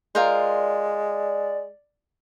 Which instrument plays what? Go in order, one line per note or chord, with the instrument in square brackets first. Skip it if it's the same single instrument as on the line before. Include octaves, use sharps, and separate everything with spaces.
[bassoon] G#3 [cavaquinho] F4 A#4 C5 [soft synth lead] D5